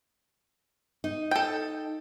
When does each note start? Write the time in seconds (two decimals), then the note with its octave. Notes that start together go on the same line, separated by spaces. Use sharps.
1.04 D#4
1.31 A4 G5